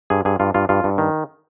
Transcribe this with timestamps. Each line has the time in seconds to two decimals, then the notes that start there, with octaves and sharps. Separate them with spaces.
0.10 G2 G#4
0.25 G2 G#4
0.40 G2 F4
0.54 G2 F4
0.69 G2 F4
0.84 G2
0.98 D#3